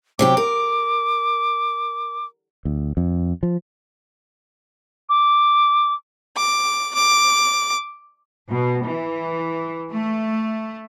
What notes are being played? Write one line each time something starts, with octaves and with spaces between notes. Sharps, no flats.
C3 F#3 G4 D6
A#4
D2
F2
F3
D6
D6
D6
B2
E3
A3